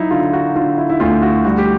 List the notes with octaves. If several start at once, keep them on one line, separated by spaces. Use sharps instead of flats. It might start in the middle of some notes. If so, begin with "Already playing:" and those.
Already playing: F#3 D#4 E4
D3 F4
F#4
D3 F4
E4
E4
D2 F4
F#4
G3 F#4
G4